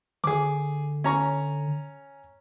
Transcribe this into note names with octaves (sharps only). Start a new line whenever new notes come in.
D3 G#4 D6
C#4 A#5 C#6